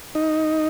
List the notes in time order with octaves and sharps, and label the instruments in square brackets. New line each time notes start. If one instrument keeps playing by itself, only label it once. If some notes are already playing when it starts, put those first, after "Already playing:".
[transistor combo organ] D#4